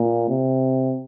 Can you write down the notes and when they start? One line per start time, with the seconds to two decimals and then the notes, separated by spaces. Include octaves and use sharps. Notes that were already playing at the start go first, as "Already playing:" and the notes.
Already playing: A#2
0.29 C3